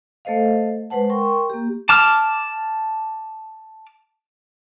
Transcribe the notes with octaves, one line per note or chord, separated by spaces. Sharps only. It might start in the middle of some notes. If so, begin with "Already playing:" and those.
A3 A4 C5 D#5 F5
G#3 B4 C5 F#5 A5
A#4 G5 C6 C#6
A#3 G4
A5 D6 F6